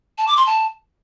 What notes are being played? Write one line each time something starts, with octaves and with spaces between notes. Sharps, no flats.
A5
D6
C6
A5